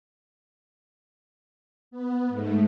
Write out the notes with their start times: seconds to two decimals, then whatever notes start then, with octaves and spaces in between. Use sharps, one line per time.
1.91 B3
2.29 G#2 A3